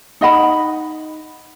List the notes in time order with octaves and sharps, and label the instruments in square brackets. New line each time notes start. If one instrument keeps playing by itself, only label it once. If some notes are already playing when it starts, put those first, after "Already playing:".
[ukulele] D#4 D#5 F#5 B5